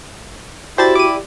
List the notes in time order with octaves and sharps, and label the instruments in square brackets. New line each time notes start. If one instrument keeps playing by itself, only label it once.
[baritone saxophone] E4 [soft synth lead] F#4 [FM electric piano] G4 D5 [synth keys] C5 A5 A6
[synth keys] D6 D#7